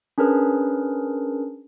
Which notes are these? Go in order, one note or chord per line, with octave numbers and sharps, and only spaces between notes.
C#4 D4 G#4 A#4 B4